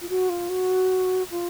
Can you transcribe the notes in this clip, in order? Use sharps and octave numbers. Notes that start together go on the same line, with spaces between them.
F4
F#4
F4
F#4
F4